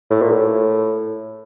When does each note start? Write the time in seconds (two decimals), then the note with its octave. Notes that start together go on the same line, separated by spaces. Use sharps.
0.10 A2
0.22 A#2
0.32 A2